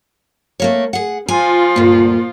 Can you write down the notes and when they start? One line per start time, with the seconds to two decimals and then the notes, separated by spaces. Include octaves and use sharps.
0.60 A3 A#3 C#5
0.93 G#4 F#5
1.28 F3 F4 G#5
1.76 D2 G2 A#2